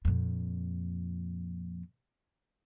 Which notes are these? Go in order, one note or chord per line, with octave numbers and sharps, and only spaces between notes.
F2 A#2